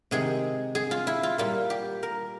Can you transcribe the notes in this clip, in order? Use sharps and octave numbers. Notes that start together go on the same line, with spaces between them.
C3 D#3 G#3 G#4
G#4
F4
E4
F4
A#2 G3 A#3 F4
G4
A#4